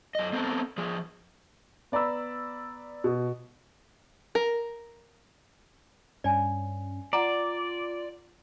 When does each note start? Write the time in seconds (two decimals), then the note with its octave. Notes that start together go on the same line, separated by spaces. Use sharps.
0.15 F#2 D#5
0.33 B3 C4 A4 A#4
0.78 F3 G#4
1.92 B3 D5 A#5 B5 E6
3.04 B2
4.35 A#4
6.24 G2 C#4 D5 G#5
7.13 F4 D5 F#5 A#5 D6